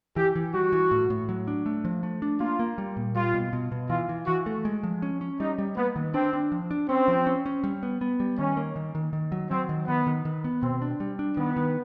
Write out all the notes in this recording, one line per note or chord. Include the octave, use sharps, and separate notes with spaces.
E3 G4
E3
G3 F#4
E3
A2
A2
F#3
D4
A3
F3
A3
D4
A#3 F4
A#3
G3
A#2
G3 F4
B2
B2
B2
E3 F4
E3
E3 F#4
A3
G#3
F3
C#4
C#4
G3 D#4
G3
A#3 B3
D#3
C4 D4
D4
F3
D4
C4 C#4
F3
C#4
C#4
G3
B3
B3
G3
D#3 C#4
A#3
D#3
D#3
D#3
F#3
F#3 C4
D#3
D#3 B3
D#3
D#3
B3
B2 C4
D4
G3
D4
D#3 B3
D#3